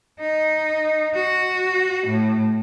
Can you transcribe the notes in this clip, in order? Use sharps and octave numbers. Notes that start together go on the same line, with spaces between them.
D#4
F#4
A2